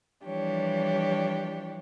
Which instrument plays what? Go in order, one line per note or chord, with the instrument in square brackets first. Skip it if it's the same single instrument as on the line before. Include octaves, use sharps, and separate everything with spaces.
[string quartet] E3 F3 G3 D4 G4 C#5